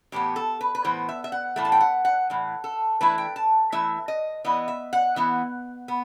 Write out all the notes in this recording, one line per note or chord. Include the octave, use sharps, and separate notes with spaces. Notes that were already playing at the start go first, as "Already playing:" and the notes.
A2 E3 B3 G4
A4
B4
B4
A2 E3 B3 C5
E5
E5
F#5
A2 E3 A3
A5
G5
F#5
F#5
A2 E3
A4
E3 A3 E4 B4
G5
A5
E3 A3 E4 E5
D#5
E3 B3 E4 D#5
E5
F#5
E3 B3 E4
B3